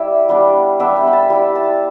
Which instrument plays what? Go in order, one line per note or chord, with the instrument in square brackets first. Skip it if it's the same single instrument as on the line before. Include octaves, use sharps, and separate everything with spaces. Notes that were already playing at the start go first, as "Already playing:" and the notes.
Already playing: [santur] G3 E4 D5 E5
G3 B3 D4
G3 B3 D4 E5
G5
B5
A5
G3 E4 B5
A5